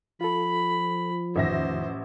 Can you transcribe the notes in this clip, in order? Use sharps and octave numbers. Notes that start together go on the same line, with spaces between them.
F3 F4 A4 B5
A1 F2 D#3 C5 E5 A#6